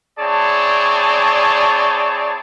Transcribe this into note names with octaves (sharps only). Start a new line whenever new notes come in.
C4 E4 G#4 C#5 D5 A5